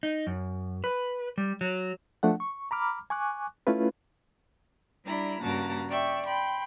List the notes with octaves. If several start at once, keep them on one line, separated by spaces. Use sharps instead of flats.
D#4
F#2
B4
G3
F#3
F3 A3 D4 F#5
C#6
A#5 B5 D6 F6
G#5 C#6 D6 F#6
A3 C#4 E4 F4 B4
G3 D4 E4 A#5 B5
G2 C#3 A#3 F#4 A5 A#5
D5 E5 G5 C#6
G5 B5 C6